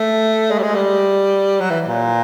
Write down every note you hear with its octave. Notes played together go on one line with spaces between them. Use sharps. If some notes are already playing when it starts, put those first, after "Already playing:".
Already playing: A3
G#3
G3
G#3
G3
F#3
E3
A#2